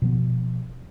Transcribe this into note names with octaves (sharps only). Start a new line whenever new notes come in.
B2 F3 B3